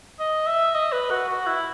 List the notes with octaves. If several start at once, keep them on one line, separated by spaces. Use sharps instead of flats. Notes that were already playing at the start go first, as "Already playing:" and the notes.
D#5
E5
D#5
B4
F#4
F#4
E4